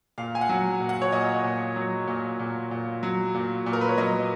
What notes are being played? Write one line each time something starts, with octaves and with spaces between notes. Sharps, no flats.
A#2 F5
G#5
F#5
F#3
A#2
F#5
C#5
A#2 D#5
A#2
F#3
A#2
A#2
A#2
F#3
A#2
A#2
A#4
B4
C#5
F#3 D#5